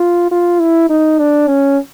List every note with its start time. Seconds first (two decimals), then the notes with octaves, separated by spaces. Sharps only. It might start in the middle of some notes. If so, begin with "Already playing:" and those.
Already playing: F4
0.31 F4
0.60 E4
0.89 D#4
1.18 D4
1.47 C#4